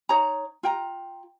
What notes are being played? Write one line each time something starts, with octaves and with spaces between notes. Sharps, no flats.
D#4 C#5 A#5
F4 G5 A#5